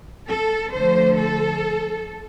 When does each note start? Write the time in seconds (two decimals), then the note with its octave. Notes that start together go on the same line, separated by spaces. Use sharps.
0.28 A4
0.72 D3 F3 A3 C5
1.17 A4